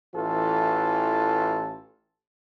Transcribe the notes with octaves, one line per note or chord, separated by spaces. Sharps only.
A1 E3 F4 A4